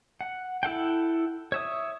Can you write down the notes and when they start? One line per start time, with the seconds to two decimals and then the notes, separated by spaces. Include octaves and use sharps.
0.21 F#5
0.63 E4 A4 F#5 G5
1.52 C#5 E5 D#6